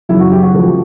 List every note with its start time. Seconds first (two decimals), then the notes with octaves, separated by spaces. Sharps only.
0.09 F#2 C#3 F#3 E4
0.20 F#4
0.32 G4
0.43 F#4
0.54 C#3 F3 A3